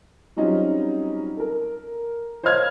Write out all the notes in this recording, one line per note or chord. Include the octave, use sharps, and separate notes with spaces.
F#3 G3 C4 C#4 D#4 F4
A4 A#4
C5 C#5 D#5 F5 F6 G#6